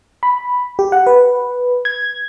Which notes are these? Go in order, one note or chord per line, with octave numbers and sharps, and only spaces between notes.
B5
G4
F#5
B4
G#6